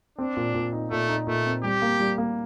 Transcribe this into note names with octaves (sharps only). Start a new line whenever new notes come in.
C4 D4
A#2
A#2
D#4
A#2 A3
D#4
A#2 A3
C4
G3 G4
A#3
G3
A#3